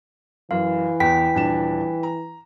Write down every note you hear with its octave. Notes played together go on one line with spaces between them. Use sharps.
F#2 E3 F5
E2 B3 G5 B6
D#1 D4 E7
A#5